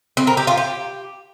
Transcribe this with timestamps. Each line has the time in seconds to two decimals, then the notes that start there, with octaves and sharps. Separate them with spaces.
0.17 C4
0.27 A#4
0.37 G4
0.47 F4
0.57 G4